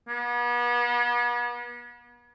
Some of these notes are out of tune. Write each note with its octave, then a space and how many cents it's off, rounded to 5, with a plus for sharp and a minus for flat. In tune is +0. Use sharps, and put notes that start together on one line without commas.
B3 -40